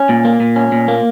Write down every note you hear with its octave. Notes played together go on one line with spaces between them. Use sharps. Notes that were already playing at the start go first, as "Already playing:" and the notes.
Already playing: C#4
A#2
A#3
A#2
C#4
A#2
A#3